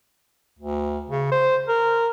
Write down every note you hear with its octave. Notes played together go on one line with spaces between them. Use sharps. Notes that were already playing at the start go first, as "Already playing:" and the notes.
D2
C#3
C5
A#4